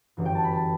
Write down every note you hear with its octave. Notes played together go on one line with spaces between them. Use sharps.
G1 F#2 E3
G5
A5
B5
A5